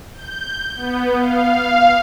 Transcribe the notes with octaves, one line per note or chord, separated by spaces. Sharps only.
G6
B3
F5